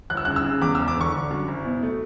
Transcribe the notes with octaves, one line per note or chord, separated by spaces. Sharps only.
G1 F#6
E6
C#3 F#6
E6
C#3
E2 D6
E1 E6
D6
D3 C#6
D3
F#2
F#1
B2
A3